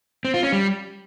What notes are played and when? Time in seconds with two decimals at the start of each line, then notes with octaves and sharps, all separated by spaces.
0.25 C4
0.34 F4
0.43 C#4
0.52 G3